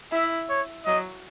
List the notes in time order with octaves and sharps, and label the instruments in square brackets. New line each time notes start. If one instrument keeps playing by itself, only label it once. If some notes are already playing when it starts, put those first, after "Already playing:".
[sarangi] E4 [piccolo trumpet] E5
[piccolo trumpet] C#5
[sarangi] F#3 [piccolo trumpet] D#5